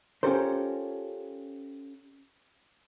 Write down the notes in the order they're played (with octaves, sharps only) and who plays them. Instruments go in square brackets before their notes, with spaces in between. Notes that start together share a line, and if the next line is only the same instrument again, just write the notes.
[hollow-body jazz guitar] C#4 F4 G4 A4 A#4 C5